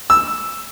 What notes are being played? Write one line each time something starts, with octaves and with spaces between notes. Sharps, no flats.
E6